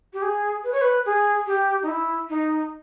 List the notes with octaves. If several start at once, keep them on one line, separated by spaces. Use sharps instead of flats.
G4
G#4
B4
C#5
B4
G#4
G4
D#4
E4
D#4